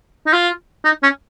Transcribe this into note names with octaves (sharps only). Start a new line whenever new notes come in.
D#4
F4
D#4
C#4